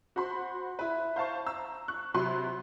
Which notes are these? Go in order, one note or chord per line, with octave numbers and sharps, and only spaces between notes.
F#4 C5 B5 C6
E4 B4
C5 F5 A5 C#6
A#5 E6
C#6 F#6
C3 F#3 B4 C6 F#6